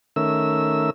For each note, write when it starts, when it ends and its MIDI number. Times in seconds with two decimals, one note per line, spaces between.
0.16 0.90 51
0.16 0.90 57
0.16 0.90 61
0.16 0.90 70
0.16 0.90 76
0.16 0.90 88